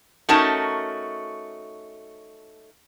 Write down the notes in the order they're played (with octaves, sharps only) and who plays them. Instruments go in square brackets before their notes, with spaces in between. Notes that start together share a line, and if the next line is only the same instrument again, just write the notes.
[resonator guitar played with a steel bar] A3 C#4 D#4 F#4 A#4 A5